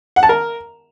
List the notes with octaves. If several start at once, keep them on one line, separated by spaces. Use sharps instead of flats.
F#5
A5
A#4